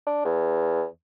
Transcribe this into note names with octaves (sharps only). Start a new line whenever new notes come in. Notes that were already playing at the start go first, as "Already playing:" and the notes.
D4
E2